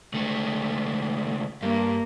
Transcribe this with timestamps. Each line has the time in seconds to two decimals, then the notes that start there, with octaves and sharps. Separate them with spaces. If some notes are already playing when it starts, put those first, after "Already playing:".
0.14 C#2 A3
1.63 G2 A#3